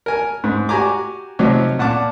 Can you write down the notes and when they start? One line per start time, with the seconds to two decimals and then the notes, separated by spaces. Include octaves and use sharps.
0.06 A#4 G#5
0.44 G#2
0.69 F#4 G4 G#5 A#5 D6
1.39 C3 F3 F#3 D#4
1.79 A#2 F#5 A5 D6